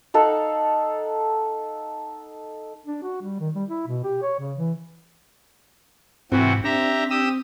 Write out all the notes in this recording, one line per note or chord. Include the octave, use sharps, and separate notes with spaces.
D#4 A4 F5 F#5
D4
F#4
G3
D#3
G3
E4
B2
G4
C#5
C#3
E3
G#2 C3 E3 C4 F#4
D4 G4 E5 A#5
G4 D#6 E6